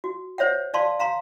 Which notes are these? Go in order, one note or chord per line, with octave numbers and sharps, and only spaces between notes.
F#4
C5 C#5 E5 F#5
D5 F5 A5 C6
F5 A#5 C6